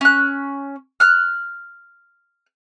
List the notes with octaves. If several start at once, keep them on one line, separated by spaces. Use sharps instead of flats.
C#4 F#6
F6 F#6